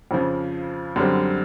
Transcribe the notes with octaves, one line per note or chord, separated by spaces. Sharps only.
F2 C#3 F3
F#2 D3 G3 C4